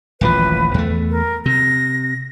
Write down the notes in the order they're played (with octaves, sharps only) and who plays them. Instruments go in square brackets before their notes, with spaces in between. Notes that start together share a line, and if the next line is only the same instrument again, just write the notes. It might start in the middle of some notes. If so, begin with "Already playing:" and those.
[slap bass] D#1 A1 F3 [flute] B4
[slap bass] E2 A3
[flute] A#4
[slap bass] C3 [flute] A#6